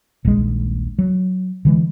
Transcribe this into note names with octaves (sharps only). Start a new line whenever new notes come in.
D#1 A#1 D#2 G#3
F#3
D3 E3 G#3